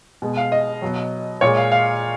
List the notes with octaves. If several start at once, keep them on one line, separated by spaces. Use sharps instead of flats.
B2 G#3
F5
D#5
B2 F#3
A#2 G#3 C#5
F5
F5